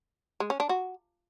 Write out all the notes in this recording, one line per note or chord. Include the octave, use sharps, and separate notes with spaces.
G#3
C#4
D4
F#4